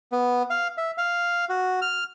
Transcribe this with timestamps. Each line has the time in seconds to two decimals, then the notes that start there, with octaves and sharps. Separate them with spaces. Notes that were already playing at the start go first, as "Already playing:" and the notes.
0.12 B3
0.50 F5
0.78 E5
0.98 F5
1.49 F#4
1.82 F6